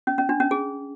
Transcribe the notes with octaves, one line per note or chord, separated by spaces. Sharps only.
C#4
C#4
D4
C#4
G#4